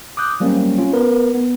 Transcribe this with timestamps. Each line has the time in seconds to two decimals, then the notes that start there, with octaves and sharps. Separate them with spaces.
0.17 D6 D#6 F#6 G6
0.40 F#3 G3 A#3 C4 C#4
0.78 C#4 F4
0.93 B3 A#4 B4
1.35 B3